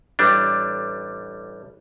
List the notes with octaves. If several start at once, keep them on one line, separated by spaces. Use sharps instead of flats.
A1 G3 D4